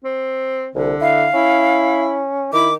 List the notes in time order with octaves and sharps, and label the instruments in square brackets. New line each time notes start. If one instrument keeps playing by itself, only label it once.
[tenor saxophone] C4
[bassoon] C2 [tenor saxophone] D3
[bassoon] E4 [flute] F5
[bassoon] C#4 [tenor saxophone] E4
[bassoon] D#3 [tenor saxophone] E4 [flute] D6